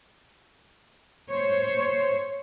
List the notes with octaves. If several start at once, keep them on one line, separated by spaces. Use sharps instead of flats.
C5 C#5